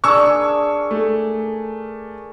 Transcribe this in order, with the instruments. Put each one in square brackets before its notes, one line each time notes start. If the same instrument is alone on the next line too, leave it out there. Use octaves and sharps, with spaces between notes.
[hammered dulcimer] D4 G#4 A#4 [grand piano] C#6 E6
[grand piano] A3